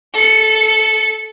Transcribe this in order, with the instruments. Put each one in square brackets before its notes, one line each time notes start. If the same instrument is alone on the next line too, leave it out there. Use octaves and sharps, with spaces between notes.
[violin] A4 C#7